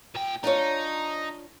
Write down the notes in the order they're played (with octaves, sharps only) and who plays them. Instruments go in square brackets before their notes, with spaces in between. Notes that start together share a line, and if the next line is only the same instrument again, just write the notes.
[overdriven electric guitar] A#2 G5
[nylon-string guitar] D4 F4 C#5 [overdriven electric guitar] D#4